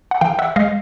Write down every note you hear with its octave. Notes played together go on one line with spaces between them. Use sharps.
F#5
E3 F5 G5
E5 F#5
G#3 D#5 F5